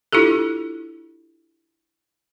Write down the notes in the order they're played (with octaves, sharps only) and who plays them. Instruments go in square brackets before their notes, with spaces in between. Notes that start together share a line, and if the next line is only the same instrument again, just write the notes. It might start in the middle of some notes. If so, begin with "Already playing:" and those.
[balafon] D4 E4 F4 G4 A4